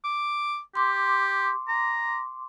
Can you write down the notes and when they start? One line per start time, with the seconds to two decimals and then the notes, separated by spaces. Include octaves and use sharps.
0.04 D6
0.75 G4 C6 D6
1.68 A#5